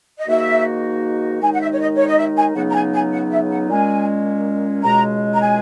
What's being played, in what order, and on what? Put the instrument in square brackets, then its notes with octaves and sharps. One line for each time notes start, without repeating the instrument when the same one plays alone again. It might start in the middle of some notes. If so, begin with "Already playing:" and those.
[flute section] D#5
[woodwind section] G#2 D#3 A#3 D#4 F#4 [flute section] E5
[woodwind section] D#2 D#3 G#3 D#4 [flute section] G#5
[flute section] F#5
E5
C#5
D#5
C#5
D#5
E5
G#5
[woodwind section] C#2 C#3 F#3 B3 D#4 [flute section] F#5
[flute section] A#5
G#5
G#5
F#5
E5
F#5
[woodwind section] A#2 G#3 C#4 [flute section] G#5
[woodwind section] C#2 B2 G#3 [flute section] A#5
[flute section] A#5
G#5